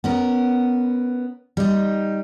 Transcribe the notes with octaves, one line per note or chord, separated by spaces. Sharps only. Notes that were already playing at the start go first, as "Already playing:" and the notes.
B3 C#4 A#4
G3 D#4